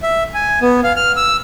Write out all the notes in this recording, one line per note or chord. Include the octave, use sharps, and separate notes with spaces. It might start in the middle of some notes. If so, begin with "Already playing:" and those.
E5
G#5
B3
F5
F6
E6